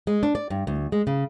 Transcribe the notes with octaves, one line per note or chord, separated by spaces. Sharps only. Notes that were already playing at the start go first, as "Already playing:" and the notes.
G#3
D4
D5
G2
D2
G#3
C#3